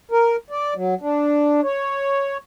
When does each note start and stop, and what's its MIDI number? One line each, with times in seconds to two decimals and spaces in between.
0.11 0.36 70
0.50 0.74 74
0.76 0.94 54
1.01 1.61 62
1.63 2.37 73